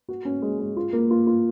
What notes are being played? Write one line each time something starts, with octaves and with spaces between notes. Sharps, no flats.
F#4
C#4
G#3
G#3
F4
A#3
F4
F4